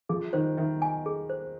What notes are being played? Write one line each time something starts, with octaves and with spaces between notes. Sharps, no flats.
F3 G#4
D#3 C5
D#3 E5
G#5
G#4
C5